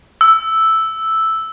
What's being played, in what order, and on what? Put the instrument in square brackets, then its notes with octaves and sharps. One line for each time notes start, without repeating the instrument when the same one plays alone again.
[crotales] E6